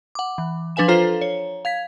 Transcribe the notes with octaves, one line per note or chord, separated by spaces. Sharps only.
F#5 D6
E3
F3 D4 B4 F5 G#5 E7
F4 A4 C5 F5 A#5
C#5
F5 G#6 B6